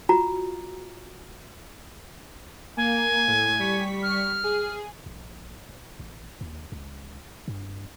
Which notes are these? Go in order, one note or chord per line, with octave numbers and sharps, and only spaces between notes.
F4 F#4 A#5
A#3 G#5
A2
G3 C#6 B6
F6
G#4
A#1
D#1
A1
D#2
C#2
G2